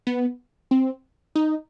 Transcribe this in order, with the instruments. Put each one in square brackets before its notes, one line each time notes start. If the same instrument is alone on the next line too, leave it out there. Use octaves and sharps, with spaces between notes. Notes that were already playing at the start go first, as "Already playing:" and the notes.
[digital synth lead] B3
C4
D#4